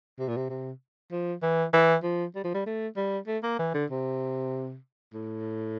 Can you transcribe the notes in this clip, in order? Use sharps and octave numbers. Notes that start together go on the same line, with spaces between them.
C3
A#2
C3
C3
F3
E3
E3
F3
G3
F3
G3
A3
G3
A3
A#3
E3
D3
C3
A2